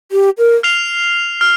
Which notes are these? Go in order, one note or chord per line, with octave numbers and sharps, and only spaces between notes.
G4
A#4
F6 C7 F7
F6